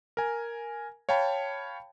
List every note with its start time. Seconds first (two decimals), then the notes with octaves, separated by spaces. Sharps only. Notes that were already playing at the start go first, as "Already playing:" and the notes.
0.17 A#4 G#5
1.09 C#5 F5 G5 A5 B5